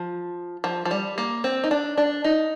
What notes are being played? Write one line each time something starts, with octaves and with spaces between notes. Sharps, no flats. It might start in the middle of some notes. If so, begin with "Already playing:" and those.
Already playing: F3
F3
F3
G3
A#3
C4
D#4
D4
D4
D#4